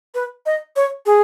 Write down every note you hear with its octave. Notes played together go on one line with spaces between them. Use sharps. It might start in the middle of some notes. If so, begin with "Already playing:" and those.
B4
D#5
C#5
G#4